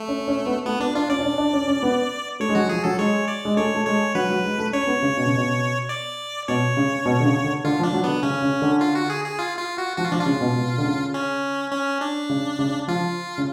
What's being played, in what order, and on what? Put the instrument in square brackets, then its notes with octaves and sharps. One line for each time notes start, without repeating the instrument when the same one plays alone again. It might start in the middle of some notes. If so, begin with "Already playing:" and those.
Already playing: [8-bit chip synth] A3
[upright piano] C#4
C#4
B3
[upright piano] A3 [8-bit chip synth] B3
[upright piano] B3 [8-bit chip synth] D4
[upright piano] D4 [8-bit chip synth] F4
[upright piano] C#4 [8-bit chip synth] D5
[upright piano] D4
C#4
D4
C#4
C#4
B3
[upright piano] A3 [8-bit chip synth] C#5
[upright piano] G#3
[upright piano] F#3 [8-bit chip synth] F#4
[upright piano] F3 [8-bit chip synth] G#4
[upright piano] F#3 [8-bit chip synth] A4
[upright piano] G#3 [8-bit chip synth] C#5
[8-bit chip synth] D5
[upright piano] G#3
[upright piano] A3 [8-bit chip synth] C#5
[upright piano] A3
[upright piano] G#3 [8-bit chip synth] C#5
[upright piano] F#3 [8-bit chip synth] B4
[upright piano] F#3
G#3
A3
[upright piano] C#4 [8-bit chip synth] C#5
[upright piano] B3
C#3
B2
C#3
B2
[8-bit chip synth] D5
[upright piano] B2 [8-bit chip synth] C#5
[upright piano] C#3
B2
D3
C#3
D3
[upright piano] D3 [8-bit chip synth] F4
[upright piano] F3
[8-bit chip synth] D4
[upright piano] F#3
[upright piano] D3 [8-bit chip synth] B3
[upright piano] C#3 [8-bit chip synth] C#4
[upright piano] C#3
D3
[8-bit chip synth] F4
F#4
G#4
G#4
F4
F4
F#4
[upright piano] F3 [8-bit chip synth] F#4
[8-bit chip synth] F4
[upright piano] F3 [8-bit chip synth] D4
[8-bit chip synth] F4
[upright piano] C#3
B2
B2
D3
C#3
[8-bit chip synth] C#4
C#4
D4
[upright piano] C#3
C#3
[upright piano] F3 [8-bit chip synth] F4
[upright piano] C#3